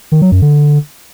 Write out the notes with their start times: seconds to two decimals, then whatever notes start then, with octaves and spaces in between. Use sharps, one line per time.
0.12 D#3
0.22 F#3
0.32 F#2
0.42 D3